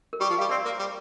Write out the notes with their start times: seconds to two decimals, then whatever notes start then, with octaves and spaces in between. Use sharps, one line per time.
0.13 A#4
0.20 G3 G4
0.30 F3
0.38 G3 F5
0.49 C4 D5
0.65 A#3
0.79 G3